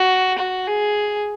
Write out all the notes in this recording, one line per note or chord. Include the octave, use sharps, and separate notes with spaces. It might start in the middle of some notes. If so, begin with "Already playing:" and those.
Already playing: F#4
F#4
G#4